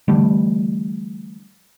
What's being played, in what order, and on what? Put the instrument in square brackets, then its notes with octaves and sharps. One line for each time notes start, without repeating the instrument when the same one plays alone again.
[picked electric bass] D3 E3 G3 A3